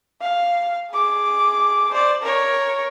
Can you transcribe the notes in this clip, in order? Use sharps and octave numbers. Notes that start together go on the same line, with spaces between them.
F5
G#4 D6
C5 D5
A#4 C#5